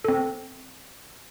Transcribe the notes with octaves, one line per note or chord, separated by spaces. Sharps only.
C4 A4